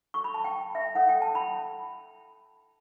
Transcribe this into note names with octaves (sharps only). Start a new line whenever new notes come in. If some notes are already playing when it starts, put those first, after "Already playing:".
F#4 A4 C#5 C#6
B5
A5
G5
E5
E4 A4 C#5 F#5
G5
A5
B5